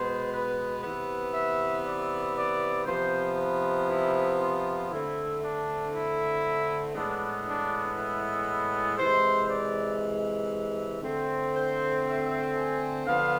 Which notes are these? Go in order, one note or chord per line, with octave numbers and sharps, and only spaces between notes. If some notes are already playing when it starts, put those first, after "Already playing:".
Already playing: B2 G#3 B3 C5
B4
C3 E3 B3
E5
D5
D5
C3 F3 B3 C5
B4
E4
F4
D3 A3 C4 E4
D4
E4
A2 E3 G#3 B3 D4
D4
E4
C3 E3 G#3 C5
D5
D3 A3 C4
C5
E5
G#5
D3 F3 B3 F5